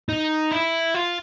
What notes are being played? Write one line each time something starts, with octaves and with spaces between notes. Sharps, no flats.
D#4
E4
F4